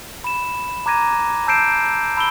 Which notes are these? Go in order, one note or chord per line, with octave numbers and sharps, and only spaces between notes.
B5 E7
A#5 D6 F#6 G#6 A#6 D#7
A5 E6 G6 C7 D7 E7
A5 B5 E6 D7 G7